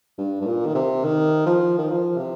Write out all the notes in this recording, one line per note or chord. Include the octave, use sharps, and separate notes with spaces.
G2
G2
A#2
D#3
C3
D#3
F3
D#3
F3
C3